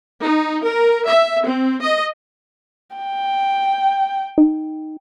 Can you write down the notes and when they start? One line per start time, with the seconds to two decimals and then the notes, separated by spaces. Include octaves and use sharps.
0.22 D#4
0.64 A#4
1.05 E5
1.43 C4
1.82 D#5
2.96 G5
4.38 D#4